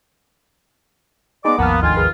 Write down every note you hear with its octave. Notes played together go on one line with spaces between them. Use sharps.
G#3 B3 D#4 D5 D6
G#1 D#2 F3 A#3 B3 F#5 A5 F6
D2 D#3 F4 G#5 G#6
G#4 B4